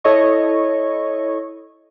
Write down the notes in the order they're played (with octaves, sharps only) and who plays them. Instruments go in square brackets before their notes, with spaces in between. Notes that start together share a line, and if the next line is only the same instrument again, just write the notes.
[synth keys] E4 A4 C#5 D#5 C#6